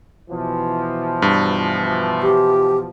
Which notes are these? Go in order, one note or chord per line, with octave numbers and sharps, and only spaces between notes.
B2 E3 F3
G2
G4